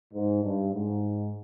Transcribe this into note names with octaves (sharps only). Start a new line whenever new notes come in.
G#2
G2
G#2